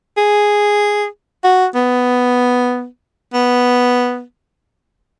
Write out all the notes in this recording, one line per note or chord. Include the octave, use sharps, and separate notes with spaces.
G#4
F#4
B3
B3